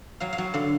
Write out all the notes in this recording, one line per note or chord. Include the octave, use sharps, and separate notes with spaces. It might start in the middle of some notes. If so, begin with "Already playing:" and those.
F#3 F5
F5
F#3
D3 F5